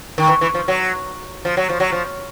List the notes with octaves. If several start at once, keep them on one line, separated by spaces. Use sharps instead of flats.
D#3
E3
E3
F3
F#3
F3
F#3
F3
F#3
F3